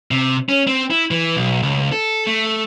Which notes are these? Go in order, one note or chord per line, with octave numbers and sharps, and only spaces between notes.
C3
C#4
C4
E4
E3
B1
C#2
A4
A3